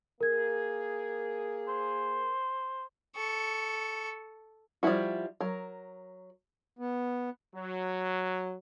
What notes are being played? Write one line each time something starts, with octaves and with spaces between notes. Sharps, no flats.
A#3 G#4 A#4 G#6
C5
A4 C#6
F3 G3 D#4 E4 F#4
F#3 A#4
B3
F#3